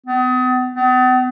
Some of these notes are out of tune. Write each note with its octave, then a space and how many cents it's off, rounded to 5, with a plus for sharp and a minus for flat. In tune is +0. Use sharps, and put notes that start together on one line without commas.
B3 +40
B3 +45